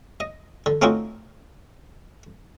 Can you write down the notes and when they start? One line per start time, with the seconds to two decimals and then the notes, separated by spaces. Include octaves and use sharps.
0.20 D#5
0.66 D3
0.82 A3 C4 C#4 D#4 F4 F#4